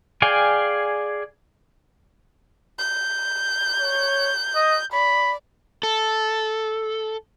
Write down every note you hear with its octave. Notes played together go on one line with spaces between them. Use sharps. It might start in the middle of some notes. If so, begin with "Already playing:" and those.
G#4 D5 F5 G5 G#5
G6
C#5
D#5
D5 B5
A4